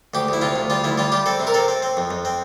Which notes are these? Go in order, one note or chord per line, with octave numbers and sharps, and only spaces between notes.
D2 G4
D2 E4
C3 F4
D2
G3 F4
D2 E4
G3 F4
G3 G4
C4 A4
C3
A#4
C4 A4
C4
C4
F2
F2
C4